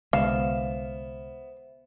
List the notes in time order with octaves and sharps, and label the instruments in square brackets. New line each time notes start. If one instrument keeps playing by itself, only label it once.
[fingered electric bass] C2 D3 G#3 [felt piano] B3 [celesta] C5 E5 E7 [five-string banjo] F5